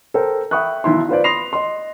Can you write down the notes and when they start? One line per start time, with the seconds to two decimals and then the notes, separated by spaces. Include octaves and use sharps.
0.14 A4 A#4 C5 G5
0.51 E5 G5 B5 C#6 D#6 F#6
0.84 B1 D#3 E4 C6
1.09 F4 B4 C5 D5
1.24 B5 C6 D#6 A#6 C7 F7
1.53 D#5 C6